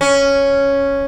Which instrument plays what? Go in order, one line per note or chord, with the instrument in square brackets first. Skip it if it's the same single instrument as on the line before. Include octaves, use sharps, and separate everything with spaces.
[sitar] C#4